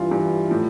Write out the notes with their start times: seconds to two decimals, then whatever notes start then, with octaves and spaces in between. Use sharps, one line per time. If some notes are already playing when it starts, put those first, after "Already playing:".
Already playing: G2 E3 F4
0.11 G2 E3
0.49 A2 F3